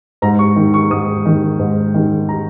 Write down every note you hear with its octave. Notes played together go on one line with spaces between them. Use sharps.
G#2 A#5
C#6
D#3
C#6
G#2 D#6
D#3
G#2
D#3
A#5